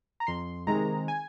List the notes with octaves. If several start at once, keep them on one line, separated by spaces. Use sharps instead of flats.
A#5
F2 C6
C3 D#3 G#3 A#5
G#5